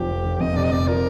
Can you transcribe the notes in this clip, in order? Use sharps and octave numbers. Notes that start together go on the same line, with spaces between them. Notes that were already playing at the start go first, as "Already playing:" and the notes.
Already playing: F1 F3 G4
F1
F1
F2 D#5
C3 D5
D#5
F2 D5
F3 A#4